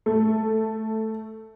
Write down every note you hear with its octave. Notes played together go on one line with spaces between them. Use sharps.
A3